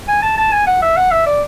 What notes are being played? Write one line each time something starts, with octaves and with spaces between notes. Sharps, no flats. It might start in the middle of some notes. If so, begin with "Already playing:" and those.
G#5
A5
A5
G#5
F#5
E5
F#5
E5
D5